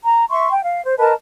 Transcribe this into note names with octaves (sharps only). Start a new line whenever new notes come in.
A#5
E5 C6 C#6
G5
F5
C5
A#4 B4 D#5 A5